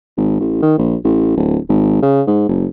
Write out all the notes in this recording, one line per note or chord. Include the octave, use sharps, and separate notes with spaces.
G#1
A1
D#3
A#1
A1
D1
G#1
C#3
G#2
F#1